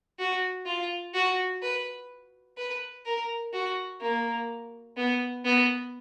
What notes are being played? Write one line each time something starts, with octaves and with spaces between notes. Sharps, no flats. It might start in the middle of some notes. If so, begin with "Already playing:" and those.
F#4
F4
F#4
B4
B4
A#4
F#4
A#3
B3
B3